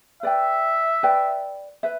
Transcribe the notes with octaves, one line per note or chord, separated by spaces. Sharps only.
B4 D5 E5 G5
B4 D5 G5
B4 E5